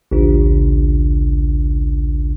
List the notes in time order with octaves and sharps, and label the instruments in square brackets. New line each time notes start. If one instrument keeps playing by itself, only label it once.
[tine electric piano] A1 D2 C#3 D4 F4